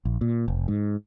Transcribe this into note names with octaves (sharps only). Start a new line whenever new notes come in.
A#1
A#2
F1
G#2